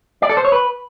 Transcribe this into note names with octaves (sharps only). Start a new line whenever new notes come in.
D5
A4
C5
C#5
B4